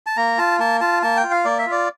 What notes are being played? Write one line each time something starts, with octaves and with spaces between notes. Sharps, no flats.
A5
A#3 A#5
F4 A5
A#3 A5
F4 A5
A#3 A5
G5
F4
F5
A#3 D5
E5
F4 D5